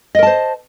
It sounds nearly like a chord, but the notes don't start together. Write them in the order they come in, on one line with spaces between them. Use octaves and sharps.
D#5 A#4 A5 C5